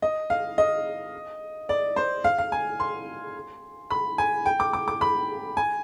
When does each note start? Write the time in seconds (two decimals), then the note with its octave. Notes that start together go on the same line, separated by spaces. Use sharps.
0.02 D#5
0.30 F5
0.58 D#5
1.69 D5
1.96 C5
2.24 F5
2.38 F5
2.52 G#5
2.80 C6
3.90 B5
4.18 G#5
4.46 G5
4.60 D6
4.73 D6
4.88 D6
5.01 B5
5.57 G#5